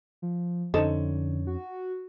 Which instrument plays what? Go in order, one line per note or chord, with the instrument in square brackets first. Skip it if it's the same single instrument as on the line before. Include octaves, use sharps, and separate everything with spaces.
[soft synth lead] F3
[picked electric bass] F2 C#4 [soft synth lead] D3 [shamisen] D#4 A4 C5
[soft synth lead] F#4